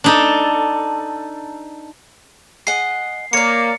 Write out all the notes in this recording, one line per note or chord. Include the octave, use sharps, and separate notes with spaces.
D4 D#4 A4
G#4 D#5 F#5 C7
A#3 C#5 D5 C#7